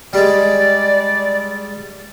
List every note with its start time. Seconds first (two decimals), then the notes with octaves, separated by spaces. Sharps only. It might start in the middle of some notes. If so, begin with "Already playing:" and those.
0.13 G3 G#3 D5